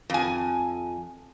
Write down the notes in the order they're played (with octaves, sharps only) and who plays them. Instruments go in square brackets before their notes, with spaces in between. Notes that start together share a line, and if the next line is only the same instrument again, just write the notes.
[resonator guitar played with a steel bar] F2 G#5